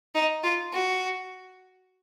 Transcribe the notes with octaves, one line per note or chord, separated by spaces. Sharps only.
D#4
F4
F#4